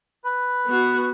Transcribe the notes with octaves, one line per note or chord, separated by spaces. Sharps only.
B4
B3 F#4